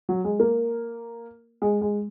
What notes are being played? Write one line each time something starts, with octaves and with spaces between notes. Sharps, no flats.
F#3
G#3
A#3
G#3
G#3